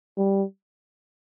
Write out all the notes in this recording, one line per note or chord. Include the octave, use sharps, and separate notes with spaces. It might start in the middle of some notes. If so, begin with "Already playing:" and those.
G3